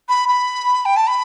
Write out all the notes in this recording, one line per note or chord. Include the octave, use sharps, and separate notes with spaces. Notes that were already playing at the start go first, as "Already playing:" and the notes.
B5
B5
G5
A5
B5